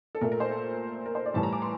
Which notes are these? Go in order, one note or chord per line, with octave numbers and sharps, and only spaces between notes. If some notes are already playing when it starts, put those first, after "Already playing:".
A4
A#2 A3 A#4
A#4
C5
A4
A#4
C5
D5
A2 E3 G3 A5
A#5
D6
C6